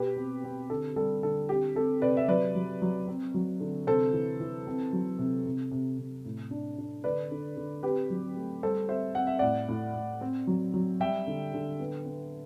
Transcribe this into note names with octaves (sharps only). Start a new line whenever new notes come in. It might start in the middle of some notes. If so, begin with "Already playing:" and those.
Already playing: B2 G4 B4
C4
C4
D3 A4
G3 A4
D3 A4
C4 G4
C4 A4
C3 B4 D5
E5
F#3 B4 D5
F#3
F#3
C4
F#3
D3
C3 A4 C5
E3
E3
C4
F#3
C3
C3
C3
C3
A2
D4
D4
D3 B4 D5
D3
D3
C4 G4 B4
F#3
A3
G3 A4 C5
C4 C5 E5
C4 F#5
E5
A2 D5 F#5
A2
A2
C4
F#3
F#3
G3 E5 G5
D3
D3
B3
B3